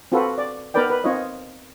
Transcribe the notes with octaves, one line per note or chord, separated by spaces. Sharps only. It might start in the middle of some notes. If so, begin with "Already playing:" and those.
C4 F4 F#4 A4 B4
D5
B3 D#4 A#4 B4 D5 G5
B4
C4 D#4 F4 C#5 D#5